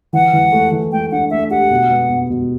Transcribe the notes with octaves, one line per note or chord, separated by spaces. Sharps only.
E3 F#5
E3
A3
E3
A3 G5
D4 F#5
A3 E5
G4 F#5
B2
B3
B2
B2